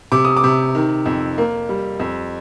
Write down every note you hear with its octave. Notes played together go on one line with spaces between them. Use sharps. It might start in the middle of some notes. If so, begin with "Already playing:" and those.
C3 D6
D#6
D6
C3
D#3
F2
A#3
G3
F2